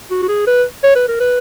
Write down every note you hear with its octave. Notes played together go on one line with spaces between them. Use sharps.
F#4
F#4
G#4
B4
C#5
B4
A#4
B4